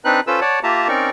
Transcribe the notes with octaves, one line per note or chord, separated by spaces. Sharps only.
C4 D4 D#4 B4 F#6
C#4 F4 A4 B4 C5 E6
C#5 D5 F#5 A5
A#3 F4 G4 E5 A5 A#5
C4 C#4 D#4 A#4 D5 C#6